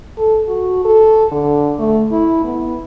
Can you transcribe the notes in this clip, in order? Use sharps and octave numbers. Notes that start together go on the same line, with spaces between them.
A4
F#4
A4
D3
A3
E4
B3